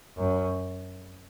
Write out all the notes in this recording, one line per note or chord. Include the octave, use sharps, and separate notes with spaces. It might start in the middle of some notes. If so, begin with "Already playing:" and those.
F#2